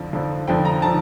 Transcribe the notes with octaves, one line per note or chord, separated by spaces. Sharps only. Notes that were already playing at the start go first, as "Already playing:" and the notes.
Already playing: F2 D3 F3
F2 D3 F3
F2 D3 F3 G5
A#5
D3 F3 A5